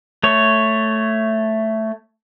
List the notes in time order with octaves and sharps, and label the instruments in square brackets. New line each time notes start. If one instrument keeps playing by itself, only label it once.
[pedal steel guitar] A3 C#5